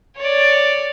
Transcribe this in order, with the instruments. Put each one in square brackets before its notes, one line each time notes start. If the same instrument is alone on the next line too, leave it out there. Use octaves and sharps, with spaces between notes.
[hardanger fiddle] C#5 D5